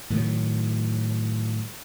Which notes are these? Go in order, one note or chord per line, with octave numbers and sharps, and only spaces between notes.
A2 D#3 F#3